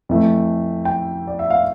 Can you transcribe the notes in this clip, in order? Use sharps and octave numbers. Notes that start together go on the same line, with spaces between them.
F2 E3 A3
G5
D5
E5
F5